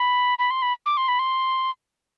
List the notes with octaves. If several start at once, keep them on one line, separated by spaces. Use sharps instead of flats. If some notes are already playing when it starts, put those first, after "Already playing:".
Already playing: B5
B5
C6
B5
D6
C6
B5
C6